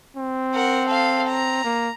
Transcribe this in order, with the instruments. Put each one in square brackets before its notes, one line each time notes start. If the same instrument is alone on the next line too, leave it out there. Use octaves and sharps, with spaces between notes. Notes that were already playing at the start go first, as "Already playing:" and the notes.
[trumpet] C4
[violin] A#4 F#5
A4 F5
A#5
[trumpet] A#3